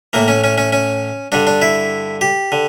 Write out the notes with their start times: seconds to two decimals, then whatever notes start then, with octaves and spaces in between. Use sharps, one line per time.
0.13 A2 E3 A#3
0.28 C#4
0.44 C#4
0.58 C#4
0.73 C#4
1.32 G2 D3 D4
1.47 D4
1.62 E4
2.21 G4
2.52 D3